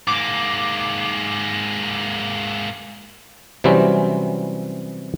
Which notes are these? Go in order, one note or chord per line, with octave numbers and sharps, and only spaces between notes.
G#2 A#3 D6
C3 E3 F#3 G3 C4 C#4